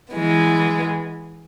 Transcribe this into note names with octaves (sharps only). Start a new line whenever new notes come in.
E3 G#3 B3